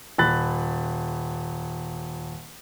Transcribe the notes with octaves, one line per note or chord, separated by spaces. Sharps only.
D#1 B5 F#6 A6